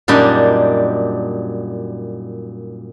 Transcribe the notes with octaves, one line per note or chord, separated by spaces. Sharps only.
F#2 A#2 G3 D4 D#4